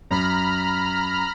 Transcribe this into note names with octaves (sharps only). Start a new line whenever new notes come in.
F#2 A#5 B5 F6